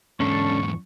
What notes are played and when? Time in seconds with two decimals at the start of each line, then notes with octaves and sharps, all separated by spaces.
0.20 E2 G#2 C#4 D4 A4 C#6